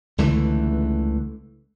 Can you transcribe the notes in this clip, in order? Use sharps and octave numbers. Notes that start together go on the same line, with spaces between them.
C#2 D3 E3 A3